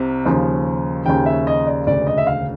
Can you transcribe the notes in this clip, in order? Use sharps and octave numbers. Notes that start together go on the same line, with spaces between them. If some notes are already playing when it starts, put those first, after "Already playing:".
Already playing: C2 C3
D#2 C#3 F3
D#2 C#3 F3 G5
E5
D#5
D5
E1 D2 C#3 D5
D#5
E5
F5